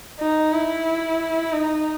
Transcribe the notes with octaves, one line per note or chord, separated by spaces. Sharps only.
D#4
E4
D#4